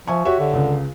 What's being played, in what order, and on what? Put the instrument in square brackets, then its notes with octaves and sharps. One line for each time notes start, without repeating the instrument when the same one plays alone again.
[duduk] F3 [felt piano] E5 G#5 C#6
[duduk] F#4 [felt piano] G4 C#5 E5
[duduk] D3
[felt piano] C#2 C#3